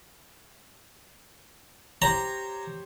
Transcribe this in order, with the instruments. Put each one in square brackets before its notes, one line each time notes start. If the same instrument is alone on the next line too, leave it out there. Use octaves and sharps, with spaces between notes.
[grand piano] G4 C5 C#5 [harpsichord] A#5